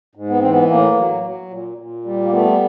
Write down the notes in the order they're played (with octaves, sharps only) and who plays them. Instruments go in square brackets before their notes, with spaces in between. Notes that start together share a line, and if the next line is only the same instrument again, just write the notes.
[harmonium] G#2
B3
E3 C4
B3
A2 A#3
F#3
F#3
A#2
A#2
G3
A#3
A3 B3